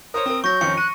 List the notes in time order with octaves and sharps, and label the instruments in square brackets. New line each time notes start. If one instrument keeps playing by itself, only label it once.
[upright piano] A#4 C5 C#5 [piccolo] D#6
[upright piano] C4 A#4
[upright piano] F#3 [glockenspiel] C#6 A#6 [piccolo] G6
[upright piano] F2 D#3 C#4 [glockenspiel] C#7
[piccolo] F#6 [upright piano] D#7